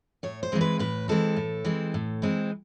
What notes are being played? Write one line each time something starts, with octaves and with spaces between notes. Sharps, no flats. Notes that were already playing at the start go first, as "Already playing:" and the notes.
A2 C#5
C5
E3 G#3 C4
B4
A2 B4
E3 G#3 C4 A4
A2
E3 G#3 C4
A2
E3 G#3 C4